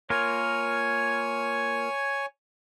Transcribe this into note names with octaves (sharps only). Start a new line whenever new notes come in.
A#3 F4 A#4 C#5 G#5